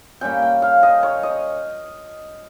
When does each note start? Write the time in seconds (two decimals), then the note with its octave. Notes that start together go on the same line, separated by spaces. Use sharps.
0.21 A#2 G3 C#4 G5
0.42 G5
0.62 F5
0.83 D#5
1.03 C#5
1.23 D#5